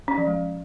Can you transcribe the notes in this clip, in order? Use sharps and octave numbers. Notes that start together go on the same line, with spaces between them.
C#4
F3
G#3